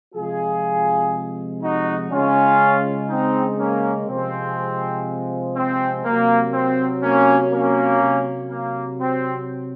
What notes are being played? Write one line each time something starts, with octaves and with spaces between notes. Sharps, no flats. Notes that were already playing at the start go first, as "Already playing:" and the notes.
C3 F3 G#3 F4 G#4
D#4 F#4
C#3 G#3 C#4 F4
C4 D#4
A#3 C#4
C3 F3 G#3 C4
C4
C3 F#3 A#3
C4
A#3 C#4
A#3 C#4
C3 F#3
A#3
C4